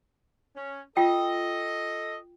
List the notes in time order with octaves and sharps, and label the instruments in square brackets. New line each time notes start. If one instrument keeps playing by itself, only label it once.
[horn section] C#4
[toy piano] F4 G5 [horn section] A4 D#5